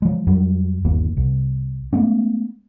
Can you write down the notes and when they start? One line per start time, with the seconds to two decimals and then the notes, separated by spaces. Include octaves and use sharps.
0.02 F3 G#3
0.27 F2 F#3 G3
0.85 G1 D#2 A#3
1.17 C2
1.93 G#3 A3 B3 C#4